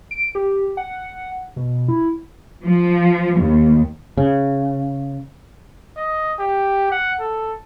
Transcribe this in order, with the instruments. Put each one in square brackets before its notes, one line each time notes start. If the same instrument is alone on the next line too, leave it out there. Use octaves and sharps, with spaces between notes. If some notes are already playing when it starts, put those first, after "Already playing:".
[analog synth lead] D7
G4
F#5
B2
E4
[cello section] F3
D#2
[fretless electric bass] C#3
[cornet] D#5
G4
F#5
A4